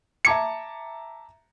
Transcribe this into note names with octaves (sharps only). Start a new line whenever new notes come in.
E5 A5 A#5 D6 G#6 C#7